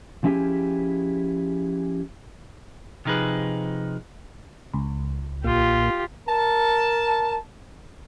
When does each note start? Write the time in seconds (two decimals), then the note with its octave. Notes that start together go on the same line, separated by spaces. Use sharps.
0.24 F3 C#4 E4 G4 G#4
3.05 C3 F3 D#4 G#4 B4
4.74 C#2
5.44 B1 A#2 F4 G4
6.28 A#4 A5